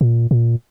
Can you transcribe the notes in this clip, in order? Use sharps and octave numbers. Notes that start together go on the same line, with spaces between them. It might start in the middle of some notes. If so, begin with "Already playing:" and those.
A#2
A#2